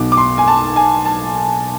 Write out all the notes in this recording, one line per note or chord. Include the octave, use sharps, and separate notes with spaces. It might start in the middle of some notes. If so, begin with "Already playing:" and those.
Already playing: B1 B2 D6
D6
C6
G#5
A5
G#5
A5